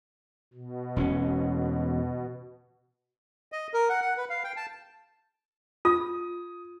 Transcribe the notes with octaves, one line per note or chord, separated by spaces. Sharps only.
B2
E1 C4 C#4
D#5
A#4
F#5
F#5
B4
F5
G5
A5
F4 D#6